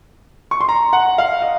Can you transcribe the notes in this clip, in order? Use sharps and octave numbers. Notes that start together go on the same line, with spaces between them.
C#6
C6
A#5
F#5
F5
D#5